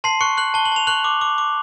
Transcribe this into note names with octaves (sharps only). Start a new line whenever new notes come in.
A5 C6 C7
C#6 F#6 C#7
F#6 F#7
A5 G7
F#7
A5 F7
C#6 F#6 F#7
D6
D6
D6